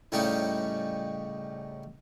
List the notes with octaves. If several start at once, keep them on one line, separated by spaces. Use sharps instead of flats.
A2 C#3 G3 C#4 D#4 G4